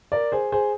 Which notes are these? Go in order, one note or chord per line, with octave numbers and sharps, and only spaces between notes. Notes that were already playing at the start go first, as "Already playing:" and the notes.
A#4 D5
G#4 C5
G#4 C5